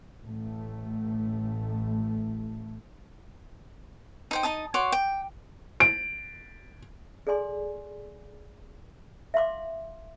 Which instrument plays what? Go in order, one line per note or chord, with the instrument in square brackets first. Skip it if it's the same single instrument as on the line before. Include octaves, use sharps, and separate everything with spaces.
[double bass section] A1 A3
[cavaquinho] D#4 C5 G5
D#4 D#5 A5 D#6
F#4 C#5 C6 D6
G5
[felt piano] D7
[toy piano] G#4 A4 D5 G#5 C6
E5 F5 C6 D6